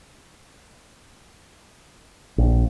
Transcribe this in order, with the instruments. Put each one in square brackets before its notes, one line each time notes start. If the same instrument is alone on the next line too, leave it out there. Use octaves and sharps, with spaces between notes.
[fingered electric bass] A#1